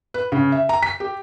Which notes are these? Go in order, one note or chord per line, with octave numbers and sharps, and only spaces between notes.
B4
C#3
E5
A#5
B6
G4